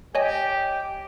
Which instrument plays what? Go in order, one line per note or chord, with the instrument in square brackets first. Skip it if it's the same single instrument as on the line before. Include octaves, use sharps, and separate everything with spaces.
[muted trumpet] G4 [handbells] C#5 D#5 G#5